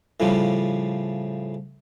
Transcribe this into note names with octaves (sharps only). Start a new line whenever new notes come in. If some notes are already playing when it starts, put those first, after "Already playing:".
A2 C#3 F3 G3